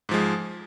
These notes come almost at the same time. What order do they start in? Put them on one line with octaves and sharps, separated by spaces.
G#2 F3 G#3